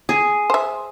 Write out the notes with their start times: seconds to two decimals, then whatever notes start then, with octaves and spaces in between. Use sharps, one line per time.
0.09 G#4
0.50 C5 E5